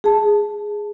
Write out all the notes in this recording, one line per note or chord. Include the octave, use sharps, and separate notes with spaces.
G#4 A5